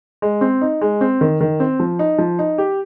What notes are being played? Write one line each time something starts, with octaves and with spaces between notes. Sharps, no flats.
G#3
C4
D#4
G#3
C4
D#3
D#3
C4
F3
D#4
F3
D#4
G4